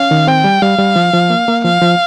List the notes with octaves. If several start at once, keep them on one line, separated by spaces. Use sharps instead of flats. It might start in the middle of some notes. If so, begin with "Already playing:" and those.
Already playing: C#4 F5
D#3
C4 G5
G3
G3 F5
G3
F3
F3
A#3
A#3
F3 F5
F3